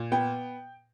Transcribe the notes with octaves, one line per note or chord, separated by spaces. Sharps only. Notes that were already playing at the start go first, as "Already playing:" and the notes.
Already playing: A#2
B3 G5